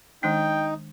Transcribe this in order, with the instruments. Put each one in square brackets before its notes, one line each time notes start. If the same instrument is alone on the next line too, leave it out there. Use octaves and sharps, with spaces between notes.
[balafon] D#3 G#3 D4 [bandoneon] D#4 [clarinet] G5